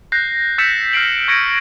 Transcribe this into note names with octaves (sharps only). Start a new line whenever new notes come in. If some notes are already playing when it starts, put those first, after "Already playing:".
F#6 G6 A#6 C7
E6 G6 A6 B6 C#7 E7
F6 B6 C7 D7 F#7
C#6 G#6 A#6 C#7 D7